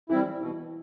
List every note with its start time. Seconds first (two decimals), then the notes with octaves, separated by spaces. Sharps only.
0.09 E3 G3 C4 E4
0.40 B2 E3